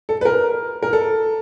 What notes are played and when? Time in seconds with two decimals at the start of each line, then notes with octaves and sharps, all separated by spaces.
0.09 A4
0.21 B4
0.25 A#4
0.83 A#4
0.93 A4